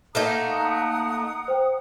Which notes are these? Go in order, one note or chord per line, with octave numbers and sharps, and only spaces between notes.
A3 A#3 D#4 F#5 A#5 D#6
C5 G5